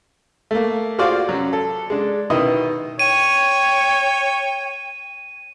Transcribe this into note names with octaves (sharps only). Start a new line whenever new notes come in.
A3 A#3
F4 F#4 G#4 C5 D5 F5
F#2 F#3
A4
G#3 D4
B2 D#3 B3 E4 D#5
C#5 G5 D#7